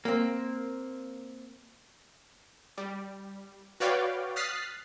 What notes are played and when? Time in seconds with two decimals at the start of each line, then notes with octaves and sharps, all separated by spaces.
0.05 A#3 C4
2.78 G3
3.80 F#4 B4 C#5 D5 F5 G5
4.36 D#6 F6 F#6 A6 B6 C7